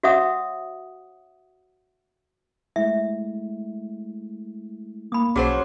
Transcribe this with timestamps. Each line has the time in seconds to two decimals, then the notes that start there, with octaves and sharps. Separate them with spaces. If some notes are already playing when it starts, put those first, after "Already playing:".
0.03 F#4 C#5 E5 F#5 D#6
2.76 G#3 A3 E4 E5
5.12 A#3 B5 D#6
5.36 B1 F3 F#3 C#4 F#4 G#4 C5 C#5